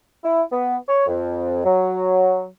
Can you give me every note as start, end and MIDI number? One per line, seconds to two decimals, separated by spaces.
0.24 0.43 64
0.51 0.76 59
0.87 1.07 73
1.07 1.62 41
1.64 2.46 54